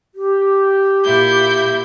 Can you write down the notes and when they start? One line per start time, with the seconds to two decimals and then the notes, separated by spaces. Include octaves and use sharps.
0.15 G4
1.04 A#2 E4 G6